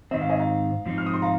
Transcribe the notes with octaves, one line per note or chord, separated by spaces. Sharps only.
G#2 D#3 C4 D#5
F5
D#5 G#5
F5 A#5
G#2 F3 C4 D#4
F6
D#6
C6
F5 A#5